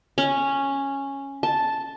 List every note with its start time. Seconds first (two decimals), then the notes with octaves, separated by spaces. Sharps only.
0.18 C#4
1.43 A5